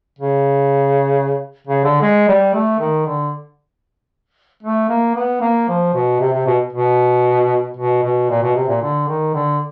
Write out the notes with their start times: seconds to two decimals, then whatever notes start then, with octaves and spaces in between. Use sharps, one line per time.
0.19 C#3
1.67 C#3
1.84 D3
2.02 G#3
2.28 G3
2.54 A3
2.79 D#3
3.06 D3
4.63 A3
4.89 A#3
5.15 B3
5.41 A#3
5.68 F3
5.94 B2
6.20 C3
6.33 C3
6.46 B2
6.73 B2
7.77 B2
8.03 B2
8.29 A#2
8.43 B2
8.55 C3
8.68 A#2
8.82 D3
9.08 D#3
9.34 D3